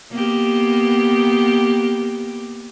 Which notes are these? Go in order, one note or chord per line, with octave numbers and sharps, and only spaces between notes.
A#3 B3 G4